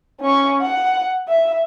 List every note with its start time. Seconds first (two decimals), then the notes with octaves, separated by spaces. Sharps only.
0.21 C#4 C#6
0.62 F#5
1.29 E5